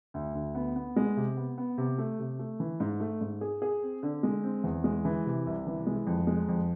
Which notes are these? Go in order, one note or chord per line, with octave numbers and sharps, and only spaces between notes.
D2
D2
B3
B3
G#3
C3
B3
B3
C3
A3
C3
A3
E3
G#2
A3
G#2
G#4
G#4
C4
D3
G#3
C4
E2
G#3
E3
C3
C2
E3
G#3
F2
G#3
F2